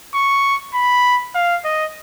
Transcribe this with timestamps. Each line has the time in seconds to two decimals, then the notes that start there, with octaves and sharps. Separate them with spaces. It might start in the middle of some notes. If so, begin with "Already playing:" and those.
0.14 C#6
0.74 B5
1.35 F5
1.65 D#5